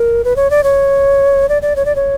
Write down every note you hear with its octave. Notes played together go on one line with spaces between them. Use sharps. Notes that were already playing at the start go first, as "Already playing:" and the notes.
Already playing: A#4
B4
C#5
D5
C#5
D5
D5
C#5
D5
C#5